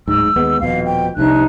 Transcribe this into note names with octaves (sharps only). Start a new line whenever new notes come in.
D1 G#2 E6
D#2 G#3 B3
D#1 F2 B2 F5
G5
F1 C2 C3 D4 D#4 F#6